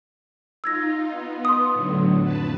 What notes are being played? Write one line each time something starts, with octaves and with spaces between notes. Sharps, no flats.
D#4 F4 E6 G#6 A#6
B3
C6 D#6
A2 D3 F#3
F2 B4 A5